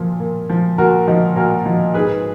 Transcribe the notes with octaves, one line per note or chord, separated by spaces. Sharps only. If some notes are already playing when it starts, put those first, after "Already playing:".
Already playing: A#2 F3
A#2
F3
A#2 F#4 A#4
F3 D#4 F#4
A#2 F#4 A#4
F3
G#2 G#4 B4